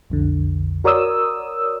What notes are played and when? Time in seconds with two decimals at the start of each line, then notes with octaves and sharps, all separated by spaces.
0.10 B1 F2 D3
0.84 F#4 A#4 C#5 D5 D#6 E6